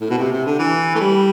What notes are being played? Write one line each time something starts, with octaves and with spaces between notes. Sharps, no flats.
A2
B2
C3
C3
D3
E3
A3
G3